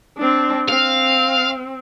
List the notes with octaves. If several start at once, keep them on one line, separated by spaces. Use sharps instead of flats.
C4 D4
C4 F5